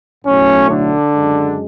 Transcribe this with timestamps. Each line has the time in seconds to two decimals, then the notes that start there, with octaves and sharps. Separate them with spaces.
0.25 B1 A2 F#3 A3 C#4 C#5
0.68 D3 D4
1.11 F#2 C#3 G#3